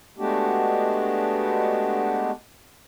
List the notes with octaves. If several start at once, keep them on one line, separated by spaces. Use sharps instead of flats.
G#3 A3 B3 D4 F#4 G4